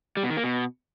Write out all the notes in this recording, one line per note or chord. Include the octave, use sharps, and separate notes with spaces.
G3
B2
D#3
A#3
B2